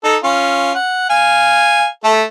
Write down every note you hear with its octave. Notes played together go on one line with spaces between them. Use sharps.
D#4 A4
C#4 F4
F#5
F5 G#5
A3 A4